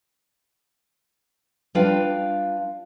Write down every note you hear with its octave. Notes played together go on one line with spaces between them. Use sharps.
G3 D4 F4 B4 F5 G5